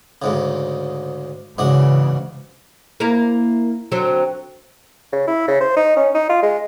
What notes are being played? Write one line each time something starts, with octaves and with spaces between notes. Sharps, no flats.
D2 G#2 C#3
G#2 C#3 E3 D4 F#4
A#3 E4 A#4
D3 F#3 C4
C#3
E4
C#3
C5
D#4
C#4
D#4
F4
G#3